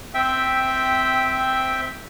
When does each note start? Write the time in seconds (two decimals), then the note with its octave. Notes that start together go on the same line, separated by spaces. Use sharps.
0.14 C4 E5 G5